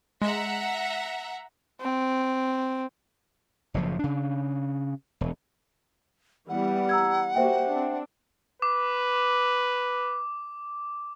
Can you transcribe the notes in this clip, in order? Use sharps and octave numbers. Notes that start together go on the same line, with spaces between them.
G#3 E5 F#5 A#5
C4
F#1 A2 C#3 F3
C#3 D4
E1
E3 G3 B3 F#5
A#5 E6 G#6
A#3 F#4 G4 C5 E5 G5
C4 D4
B4 D6